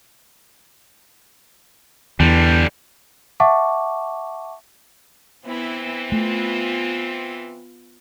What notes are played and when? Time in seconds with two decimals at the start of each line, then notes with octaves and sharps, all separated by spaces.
2.20 E2 D3 E3 G3
3.40 E5 F#5 A5 C#6 D6
5.45 E3 B3 C4 E4
6.12 A3 B3 F4